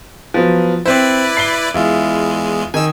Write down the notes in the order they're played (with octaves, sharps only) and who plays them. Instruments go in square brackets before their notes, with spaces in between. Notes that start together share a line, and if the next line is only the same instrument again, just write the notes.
[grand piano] F3 F#3 B3
[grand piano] C4 C5 [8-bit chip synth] E4 B4 D5
[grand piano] C7 G7
[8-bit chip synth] E2 G#3 [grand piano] E4 F4
[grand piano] D#3 D#4 [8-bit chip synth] G#5 E6